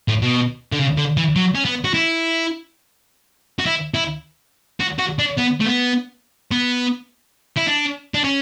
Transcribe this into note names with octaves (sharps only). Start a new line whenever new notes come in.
A2
B2
D3
C#3
D3
E3
F#3
C#4
B3
F#4
E4
F#4
E4
E4
F#4
F#4
D4
B3
A3
B3
B3
E4
D4
D4
C#4